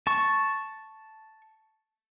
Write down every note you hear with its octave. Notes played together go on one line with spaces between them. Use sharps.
A5 C#6